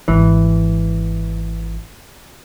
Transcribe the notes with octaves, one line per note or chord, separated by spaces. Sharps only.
G#1 E3